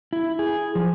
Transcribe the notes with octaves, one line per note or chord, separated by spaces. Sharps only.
E4
G#4
F3